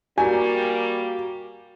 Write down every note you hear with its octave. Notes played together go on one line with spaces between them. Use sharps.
G3 A#3 F#4 G4 G#5 A#5